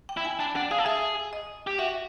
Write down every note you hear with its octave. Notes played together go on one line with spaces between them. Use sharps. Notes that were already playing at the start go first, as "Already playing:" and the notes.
G5
E4
G#5
D4 G5
D4 F#5
G#4 F5
A4
G#4 E5
D#5
G4
F#4 E5